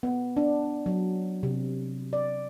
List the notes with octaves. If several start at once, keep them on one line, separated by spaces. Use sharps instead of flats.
B3
D4
F#3
C3
D5